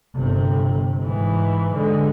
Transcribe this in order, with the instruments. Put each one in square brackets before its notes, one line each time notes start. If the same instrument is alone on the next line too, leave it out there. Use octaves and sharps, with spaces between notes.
[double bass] G1 C3
G#2 E3
D3 G#3